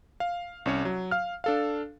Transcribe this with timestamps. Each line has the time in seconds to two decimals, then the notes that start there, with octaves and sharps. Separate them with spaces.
0.20 F5
0.66 C2 C#4 C#5
0.85 F#3
1.11 F5 F6
1.44 D4 A4 F5